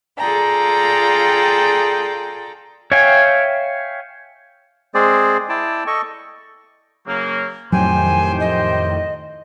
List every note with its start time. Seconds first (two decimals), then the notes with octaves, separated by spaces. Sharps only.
0.18 F4 G#4 A4 D5 G5 A#5
2.92 C#5 E5 F5 G5 G#5
4.94 G#3 C4 G#4 C5 D5
5.49 E4 D5 G5 A5
5.87 A4 D#5 C#6
7.06 C#3 F#3 A#3
7.72 F2 A2 D#3 F#3 G4 C5 G5 G#5
8.40 D#5